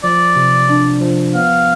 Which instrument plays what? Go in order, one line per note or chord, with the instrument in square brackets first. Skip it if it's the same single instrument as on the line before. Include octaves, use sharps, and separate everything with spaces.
[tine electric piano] F3 [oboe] D5
[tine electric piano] C3
D4
F3
[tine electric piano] B3 [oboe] F5